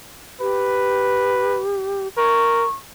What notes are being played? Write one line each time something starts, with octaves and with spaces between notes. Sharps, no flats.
G4 B4
A#4 C#6